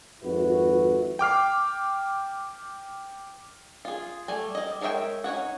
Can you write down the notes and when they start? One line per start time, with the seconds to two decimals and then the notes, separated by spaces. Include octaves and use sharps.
0.22 G#1 F2 E4 F#4 B4
1.19 G5 D6 F6 C7
3.85 F4 G#4
4.28 G3 A3 G#5
4.55 G3 D#5
4.81 G#3 A#4 C#5 E5 G5
5.24 C#4 D#4 C#5 F#5